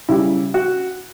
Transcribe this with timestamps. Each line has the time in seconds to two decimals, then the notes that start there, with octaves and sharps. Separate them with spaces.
0.09 C#3 G3 E4
0.54 F#4